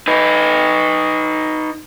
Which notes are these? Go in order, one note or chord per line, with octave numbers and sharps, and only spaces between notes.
D#4 B4